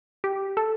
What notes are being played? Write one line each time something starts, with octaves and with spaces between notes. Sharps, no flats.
G4
A4